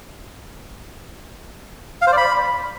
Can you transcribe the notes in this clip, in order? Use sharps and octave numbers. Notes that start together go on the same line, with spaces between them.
F5
C5
D5
B5